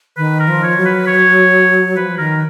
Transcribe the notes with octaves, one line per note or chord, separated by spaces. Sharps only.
D#3 B4
A#4
F3
C#5
F#3
B4
C#5
F3 B4
D#3 A#4